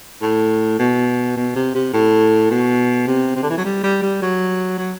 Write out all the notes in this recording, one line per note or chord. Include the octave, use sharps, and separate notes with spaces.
A2
B2
B2
C3
C3
A2
B2
C3
C3
D3
E3
F#3
G3
G3
G3
F#3
F#3